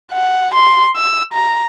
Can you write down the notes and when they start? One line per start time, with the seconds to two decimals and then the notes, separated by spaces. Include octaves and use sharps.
0.12 F#5
0.55 C6
0.96 E6
1.33 A#5